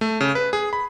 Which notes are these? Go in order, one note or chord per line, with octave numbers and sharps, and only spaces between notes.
A3
C#3
B4
G#4
B5